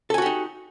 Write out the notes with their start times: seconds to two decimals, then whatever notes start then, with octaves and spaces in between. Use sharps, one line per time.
0.10 A4
0.14 G#5
0.18 F#4
0.22 G4
0.26 D#4